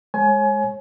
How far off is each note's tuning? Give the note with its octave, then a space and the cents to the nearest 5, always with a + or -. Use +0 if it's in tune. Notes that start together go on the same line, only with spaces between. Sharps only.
G#3 +0 C#5 -30 G#5 +25